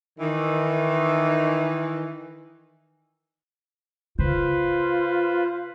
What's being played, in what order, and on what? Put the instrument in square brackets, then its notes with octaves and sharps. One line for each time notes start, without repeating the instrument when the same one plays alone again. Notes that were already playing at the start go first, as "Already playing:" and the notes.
[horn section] D#3 E3
[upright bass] C#3 [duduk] F4 [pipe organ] B4 C5